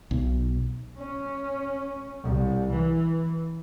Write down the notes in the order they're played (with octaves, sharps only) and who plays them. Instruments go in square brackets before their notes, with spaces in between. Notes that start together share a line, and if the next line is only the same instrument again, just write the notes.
[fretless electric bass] B1
[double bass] C#4
C2
E3